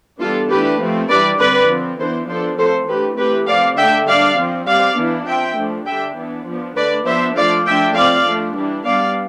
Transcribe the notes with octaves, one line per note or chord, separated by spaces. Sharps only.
E3 G3 B3 D4 F4 A4
E3 A3 D4 G4 B4
F3 A3 C4
E3 G3 D4 B4 D5
D3 G3 C4 B4 D5
F3 C4
E3 B3 D4 A4 C5
F3 B3 D4 A4 C5
F3 A3 C4 A4 C5
E3 A3 D4 G4 B4
E3 A3 C4 G4 B4
F3 C4 D5 F5
D3 A3 D4 E5 G5
G3 D4 D5 F5
F3 C4
G3 C4 D5 F5
E3 B3 D4
F3 C4 E5 G5
F3 A3 D4
D3 G3 D4 E5 G5
E3 B3 D4
F3 B3 D4
D3 A3 D4 B4 D5
F3 B3 D4 C5 E5
F3 A3 D4 D5 F5
F3 A3 D4 E5 G5
F3 C4 D5 F5
F3 A3 D4
E3 G3 D4
G3 B3 D4 D5 F5